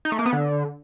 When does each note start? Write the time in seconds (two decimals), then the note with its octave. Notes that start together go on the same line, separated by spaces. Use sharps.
0.05 D#4
0.12 A3
0.19 A#3
0.26 B3
0.33 D3